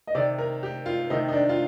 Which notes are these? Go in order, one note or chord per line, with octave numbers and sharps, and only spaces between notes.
D#5
C3 D#3 D5
A#4
G4
F4
C3 D#3 D#4
D#4
D4
F4